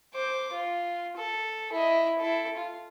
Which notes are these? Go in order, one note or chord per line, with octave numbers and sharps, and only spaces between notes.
C5 D6
F4
A4
E4 D#5
E4 A4
F4